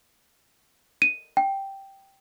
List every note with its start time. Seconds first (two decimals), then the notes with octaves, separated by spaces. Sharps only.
1.02 D#7
1.37 G5